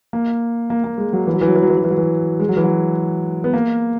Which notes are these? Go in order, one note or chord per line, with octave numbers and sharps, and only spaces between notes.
A#3
A#3
A#3
G#3
F#3
E3
F#3
E3
F#3
E3
F#3
E3
F#3
E3
F#3
E3
G#3
F#3
E3
F#3
B3
A#3